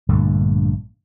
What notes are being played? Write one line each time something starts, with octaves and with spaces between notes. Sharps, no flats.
A#1 G2 D3 A3